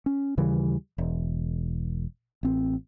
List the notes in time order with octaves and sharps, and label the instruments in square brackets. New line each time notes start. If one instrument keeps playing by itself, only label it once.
[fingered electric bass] C#4
D#2 C#3 E3 G3
E1
A1 C4